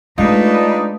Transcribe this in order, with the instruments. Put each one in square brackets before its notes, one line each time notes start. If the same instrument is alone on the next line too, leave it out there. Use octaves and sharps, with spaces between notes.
[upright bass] G#3 [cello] A3 B4 [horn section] D4 D#4 [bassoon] F4